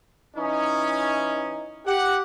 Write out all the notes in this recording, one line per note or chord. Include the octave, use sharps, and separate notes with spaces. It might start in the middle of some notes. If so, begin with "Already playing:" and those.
E3 C#4 D#4
G4 F#5